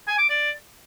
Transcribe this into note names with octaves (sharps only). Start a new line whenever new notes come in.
G#5
D6
D5